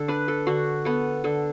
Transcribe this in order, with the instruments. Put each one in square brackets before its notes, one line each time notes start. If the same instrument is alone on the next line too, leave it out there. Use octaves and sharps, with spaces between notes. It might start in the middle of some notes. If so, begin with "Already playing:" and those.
Already playing: [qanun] D3 A4
D4 B4
A4
D3 F#4
B3 A4
D3 A4